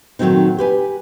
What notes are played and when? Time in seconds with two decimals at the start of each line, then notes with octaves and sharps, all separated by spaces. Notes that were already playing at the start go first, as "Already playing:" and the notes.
0.19 A#2 D#3 F#3 A3 C4 D#4
0.58 G4 B4 G#5